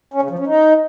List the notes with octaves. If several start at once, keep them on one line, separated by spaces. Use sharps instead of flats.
C#4
C#3
F3
C#4
D#4